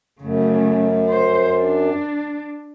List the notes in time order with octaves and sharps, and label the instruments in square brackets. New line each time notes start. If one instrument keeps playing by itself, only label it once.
[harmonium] F#2 [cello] C#3 A3
[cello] C5
D4